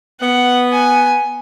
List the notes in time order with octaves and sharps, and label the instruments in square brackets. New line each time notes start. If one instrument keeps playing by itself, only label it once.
[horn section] B3 [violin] F#5
[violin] G#5